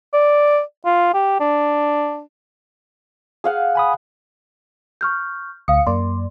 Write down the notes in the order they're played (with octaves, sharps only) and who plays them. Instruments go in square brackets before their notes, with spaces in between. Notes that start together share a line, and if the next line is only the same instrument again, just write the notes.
[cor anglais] D5
F4
G4
D4
[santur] G#4 F5 F#5
[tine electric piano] G#5 B5 D#6
[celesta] C#6 F6 G6
[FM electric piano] D2 C#7 [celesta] F5 D#6
[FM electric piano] F#2 A#3 D5 [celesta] C6